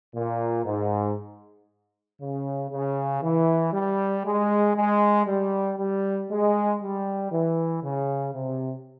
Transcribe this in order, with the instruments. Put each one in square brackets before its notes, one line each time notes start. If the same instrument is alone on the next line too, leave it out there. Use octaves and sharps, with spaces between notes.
[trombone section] A#2
G#2
C#3
C#3
E3
G3
G#3
G#3
G3
G3
G#3
G3
E3
C#3
C3